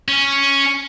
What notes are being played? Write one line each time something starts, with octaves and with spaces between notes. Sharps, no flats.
C#4